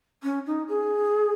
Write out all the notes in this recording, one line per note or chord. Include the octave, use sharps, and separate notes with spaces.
C#4
D#4
G#4